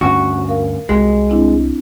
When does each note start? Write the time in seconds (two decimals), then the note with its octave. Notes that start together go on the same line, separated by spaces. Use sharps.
0.01 D2 G2 C#4 F#4
0.48 A#4 F5
0.89 C2 G#3 F#4
1.30 C4 D4 E4